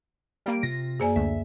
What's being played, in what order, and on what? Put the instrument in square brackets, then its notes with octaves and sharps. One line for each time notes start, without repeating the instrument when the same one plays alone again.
[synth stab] G3 A#3 D7
[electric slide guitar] C3 F4 [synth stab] A#6
[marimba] F#2 A#3 D5 [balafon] G#4 C5 G#5
[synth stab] D2 [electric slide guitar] E5